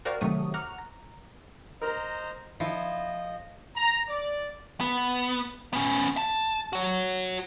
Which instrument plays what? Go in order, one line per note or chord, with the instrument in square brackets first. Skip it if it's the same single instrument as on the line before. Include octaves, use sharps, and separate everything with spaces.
[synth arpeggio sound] F#4 A#4 C5 D5 F5 G5
C3 D#3 F#3 A3 C#6 D#6
F#5 A#5 C#6 D6 F6
A#5
[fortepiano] A#4 [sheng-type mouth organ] C5 D#5 A#5
[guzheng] F3 [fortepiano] E4 [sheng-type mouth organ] D#5
[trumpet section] A#5
D5
[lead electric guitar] B3
B3 C#4
A5
F#4 C#5